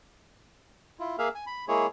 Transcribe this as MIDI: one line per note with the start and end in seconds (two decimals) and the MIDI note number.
1.00 1.16 64
1.00 1.16 65
1.18 1.29 58
1.18 1.29 68
1.18 1.29 76
1.18 1.29 77
1.35 1.45 80
1.47 1.65 83
1.68 1.86 56
1.68 1.86 58
1.68 1.86 64
1.68 1.86 68
1.68 1.86 73